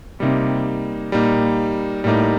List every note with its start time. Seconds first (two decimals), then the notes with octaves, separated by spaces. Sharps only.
0.20 C3 G3 A#3 D#4
1.12 A#2 G3 A#3 D#4
2.04 A2 G3 A#3 D#4